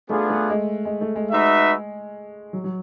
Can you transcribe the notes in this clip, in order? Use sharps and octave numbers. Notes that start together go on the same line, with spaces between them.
A3 B3 D4 F4 G#4
A3
G#3
G#3
A3
G#3
D#4 F#4 B4 E5
F#3
F#3